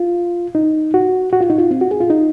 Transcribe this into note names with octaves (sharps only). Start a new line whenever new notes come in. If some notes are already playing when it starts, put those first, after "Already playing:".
Already playing: F4
D#4
F#4
F#4
F4
D#4
F4
C4
F#4
G#4
F4
D#4